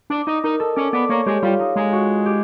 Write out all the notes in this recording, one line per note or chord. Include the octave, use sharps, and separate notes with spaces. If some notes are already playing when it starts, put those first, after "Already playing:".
D4 D5
D#4 D#5
D#4 A#4
A4
C#4 D5
B3 D5
A#3 C#5
G#3 G4
G3 F4
D#4
G#3 D#4
F#4
G4